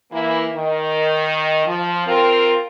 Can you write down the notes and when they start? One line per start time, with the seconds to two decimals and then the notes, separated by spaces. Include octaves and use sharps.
0.11 E3 A#3 E4
0.53 D#3
1.66 F3
2.07 C4 F4 A#4